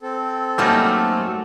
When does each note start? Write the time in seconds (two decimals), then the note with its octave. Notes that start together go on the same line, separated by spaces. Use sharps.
0.01 C4 A4
0.58 F#3 G3 A3 A#3 C#4 D#4